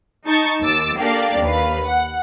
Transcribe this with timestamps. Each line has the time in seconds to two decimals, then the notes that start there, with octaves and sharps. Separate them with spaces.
0.26 D#4 A5 C#6 G6 A6
0.62 D#2 D6 E6 A6
0.97 A#3 D4 G4 A4 D5 F5
1.41 D#2 B4 F5
1.86 F#5